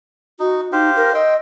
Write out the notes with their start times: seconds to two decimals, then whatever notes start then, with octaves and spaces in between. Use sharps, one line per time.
0.40 D#4 F#4
0.72 D#4 G4 C5 F5
0.96 A#4
1.15 D#5 G5 C6 E6